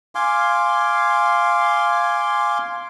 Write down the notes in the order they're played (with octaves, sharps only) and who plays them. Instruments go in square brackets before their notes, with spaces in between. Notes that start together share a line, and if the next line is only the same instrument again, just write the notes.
[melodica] F5 G#5 C6 D6